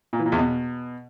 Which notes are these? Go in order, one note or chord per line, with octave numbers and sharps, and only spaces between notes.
A#2
E3
A#2
E2
B2